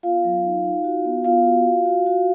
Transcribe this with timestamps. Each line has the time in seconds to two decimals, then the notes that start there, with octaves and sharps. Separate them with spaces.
0.03 B3 F4 F5
0.24 F#3
0.44 D#4
0.64 D#4
0.84 F#4
1.05 B3
1.24 B3 F4 F5
1.45 F#4
1.66 F#4
1.85 F#4
2.06 F#4